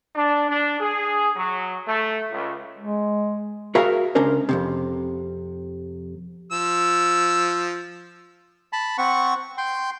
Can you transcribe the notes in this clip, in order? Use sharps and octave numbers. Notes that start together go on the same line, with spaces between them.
D4
D4
G#4
F#3
A3
C#2
G#3
F#4 G#4 A#4 E5 F5
C#2 C#4 D4 A#4 C5
F2 G#2 C3
F3 E6
A5 B5
C4 F#5 C#6
G5 C6